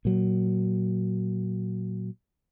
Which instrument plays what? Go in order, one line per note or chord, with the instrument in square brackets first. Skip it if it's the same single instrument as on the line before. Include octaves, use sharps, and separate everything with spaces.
[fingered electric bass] A#2 F#3